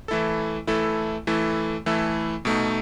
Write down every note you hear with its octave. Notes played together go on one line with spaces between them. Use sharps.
E3 A3 E4 A4
E3 A3 E4 A4
E3 A3 E4 A4
E3 A3 E4 A4
B2 A3 D#4